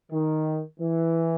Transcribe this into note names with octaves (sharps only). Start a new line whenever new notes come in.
D#3
E3